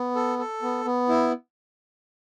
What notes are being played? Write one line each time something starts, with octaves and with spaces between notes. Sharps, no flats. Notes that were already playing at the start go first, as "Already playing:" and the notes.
Already playing: B3
A4
A4
B3
B3
E4